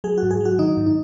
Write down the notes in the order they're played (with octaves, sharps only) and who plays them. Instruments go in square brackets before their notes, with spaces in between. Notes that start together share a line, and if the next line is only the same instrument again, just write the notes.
[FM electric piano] F#3 G#4
F#4
G#2
G#4
F#3 F#4
D#3 D#4
G#2
D#4